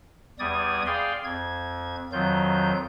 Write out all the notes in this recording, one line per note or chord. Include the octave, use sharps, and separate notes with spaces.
E2 G3 D5 D#6 G#6
G#4 D5 F5 G5 C6
F2 G#6
F2 D#3 F#3 F4 G6